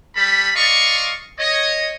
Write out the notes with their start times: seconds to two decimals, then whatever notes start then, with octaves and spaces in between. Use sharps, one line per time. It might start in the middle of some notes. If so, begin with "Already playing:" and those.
0.16 G3 A4 B5
0.55 D5 D#5 F5 C6 C#6
1.38 C#5 D#5